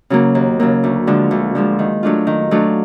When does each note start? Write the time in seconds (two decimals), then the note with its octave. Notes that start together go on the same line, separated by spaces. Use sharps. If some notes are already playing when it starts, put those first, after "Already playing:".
0.10 C#3 F#3 A#3
0.35 D#2
0.60 C#3 F#3 A#3
0.84 D2
1.07 D3 F3 G#3
1.31 D2
1.55 D3 F3 G#3
1.79 D#3
2.03 F#3 A3 D4 F4
2.27 D#3
2.51 F#3 A3 D4 F4